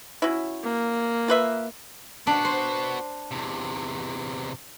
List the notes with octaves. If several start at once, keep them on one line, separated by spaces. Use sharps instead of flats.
F#3 C#4 E4
A#3
F4 B4 E5
B3 D4 F#4
C5
E2 C3